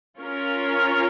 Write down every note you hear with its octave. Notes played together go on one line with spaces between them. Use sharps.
C#4 F4 A#4 C#5